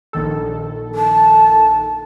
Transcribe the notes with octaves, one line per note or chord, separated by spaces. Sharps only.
A#1 D#3 A4
A5